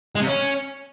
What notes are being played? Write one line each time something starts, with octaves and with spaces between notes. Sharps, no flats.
G#3
C3
C#4